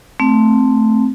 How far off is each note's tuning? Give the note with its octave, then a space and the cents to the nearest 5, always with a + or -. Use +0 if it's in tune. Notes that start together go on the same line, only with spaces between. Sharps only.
A3 +0 C4 +0